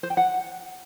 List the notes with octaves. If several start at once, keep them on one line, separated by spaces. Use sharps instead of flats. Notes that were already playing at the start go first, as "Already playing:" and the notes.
C5
G5
F#5